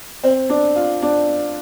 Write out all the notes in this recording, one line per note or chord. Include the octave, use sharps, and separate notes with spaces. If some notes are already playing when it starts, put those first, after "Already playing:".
C4
D4
F4
D4